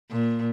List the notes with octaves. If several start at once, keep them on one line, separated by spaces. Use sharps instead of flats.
A#2